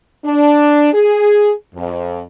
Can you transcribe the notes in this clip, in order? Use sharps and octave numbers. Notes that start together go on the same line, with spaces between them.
D4
G#4
F2